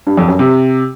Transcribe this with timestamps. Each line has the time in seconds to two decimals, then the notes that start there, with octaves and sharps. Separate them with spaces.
0.07 G2
0.18 F2
0.28 F#2
0.39 C3